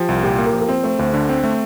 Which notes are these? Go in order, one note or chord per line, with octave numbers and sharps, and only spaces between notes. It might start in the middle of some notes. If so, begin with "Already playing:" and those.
Already playing: F3 G4
C2
A#2 G4
A#3
A#4
F3
A#4
C4 C5
A3 C5
D2 C5
D3
C4
A3